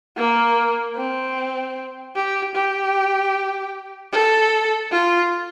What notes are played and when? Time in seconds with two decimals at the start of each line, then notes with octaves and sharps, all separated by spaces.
0.17 A#3
0.96 C4
2.15 G4
2.55 G4
4.13 A4
4.91 F4